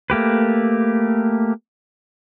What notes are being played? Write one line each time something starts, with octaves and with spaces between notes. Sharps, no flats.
A3 A#3 G4 B4